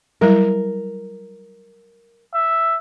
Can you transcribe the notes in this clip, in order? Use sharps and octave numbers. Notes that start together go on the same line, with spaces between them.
F#3 G3 E4 A#4
E5